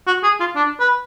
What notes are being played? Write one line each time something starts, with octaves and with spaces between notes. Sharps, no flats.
F#4
G#4
F4
D4
B4